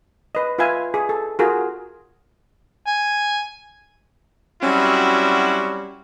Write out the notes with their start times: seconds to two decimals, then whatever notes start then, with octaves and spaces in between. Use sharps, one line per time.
0.35 B4 D#5
0.59 F4 B4 E5 F5 G#5
0.94 G#4
1.09 A4
1.39 F4 F#4 G#4 A#4
2.87 G#5
4.62 F#3 G3 C4 C#4 E4 F#4